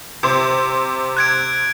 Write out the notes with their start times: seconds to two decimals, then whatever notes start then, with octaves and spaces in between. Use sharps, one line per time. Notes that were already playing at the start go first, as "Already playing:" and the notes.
0.23 C3 C5
1.17 F#6 G#6 D7